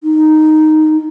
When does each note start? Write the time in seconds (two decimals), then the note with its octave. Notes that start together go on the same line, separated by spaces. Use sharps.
0.04 D#4